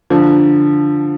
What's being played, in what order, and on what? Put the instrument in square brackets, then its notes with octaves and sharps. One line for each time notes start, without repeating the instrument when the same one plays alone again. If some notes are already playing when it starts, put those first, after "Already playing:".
[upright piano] D3 F3